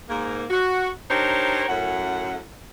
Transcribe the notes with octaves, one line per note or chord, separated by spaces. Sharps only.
G#2 A#3
F#4
D4 D#4 G4 A#4 C5 C#5
F#2 A2 F#5